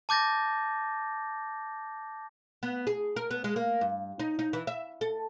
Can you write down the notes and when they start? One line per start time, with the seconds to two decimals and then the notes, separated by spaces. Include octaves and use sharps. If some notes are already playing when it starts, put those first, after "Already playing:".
0.09 A5 D6 G6 A6 A#6
2.63 B3
2.87 G#4
3.16 A#4
3.31 B3
3.44 G#3
3.56 A#3
3.81 G2
4.20 D#4
4.39 D#4
4.53 E3
4.67 E5
5.01 A4